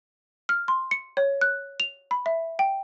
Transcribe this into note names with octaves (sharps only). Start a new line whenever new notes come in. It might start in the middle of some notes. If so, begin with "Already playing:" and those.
F6
C6
C#7
C#5
F#6
F7
B5
E5
G5